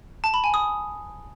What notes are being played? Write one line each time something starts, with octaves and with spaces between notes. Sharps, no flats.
A5
B5
G#5
D#6